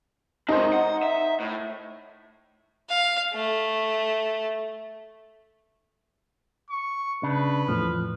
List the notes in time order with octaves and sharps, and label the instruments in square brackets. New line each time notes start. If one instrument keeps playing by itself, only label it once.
[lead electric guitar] G#3 C4 [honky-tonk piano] D#4 C5
[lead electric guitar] F#5
E5
A2
[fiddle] F5
A3
[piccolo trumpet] C#6
[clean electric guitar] C#3 D4 [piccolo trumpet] B4
[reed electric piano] E2 A2 [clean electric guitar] F3